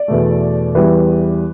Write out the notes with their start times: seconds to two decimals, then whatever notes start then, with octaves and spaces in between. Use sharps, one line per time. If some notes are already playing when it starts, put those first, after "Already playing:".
Already playing: D5
0.08 E2 B2 A3
0.75 E2 E3 G3 B4